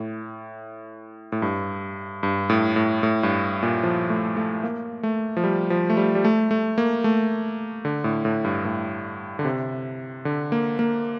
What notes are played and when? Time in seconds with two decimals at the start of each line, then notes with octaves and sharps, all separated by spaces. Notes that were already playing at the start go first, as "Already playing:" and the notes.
Already playing: A2
1.32 A2
1.42 G2
2.23 G2
2.50 A2
2.76 A2
3.03 A2
3.23 G2
3.63 A#2
3.83 F3
4.10 A3
4.37 A3
4.63 A#3
5.03 A3
5.37 F3
5.44 G3
5.70 F3
5.90 A3
5.97 G3
6.15 G3
6.25 A3
6.51 A3
6.78 A#3
7.04 A3
7.85 D3
8.04 A2
8.25 A2
8.44 G2
8.65 A2
9.39 D3
9.45 C3
10.25 D3
10.52 A#3
10.79 A#3